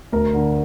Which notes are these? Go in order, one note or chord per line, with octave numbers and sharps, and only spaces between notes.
D2 A#4
D3